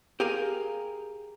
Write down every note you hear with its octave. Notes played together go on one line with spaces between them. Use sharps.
G4 G#4 A#4 F5 G#5